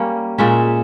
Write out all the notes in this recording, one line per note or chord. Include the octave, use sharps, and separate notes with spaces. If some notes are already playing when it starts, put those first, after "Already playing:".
Already playing: G3 A#3 C#4
A#2 G#3 C#4 E5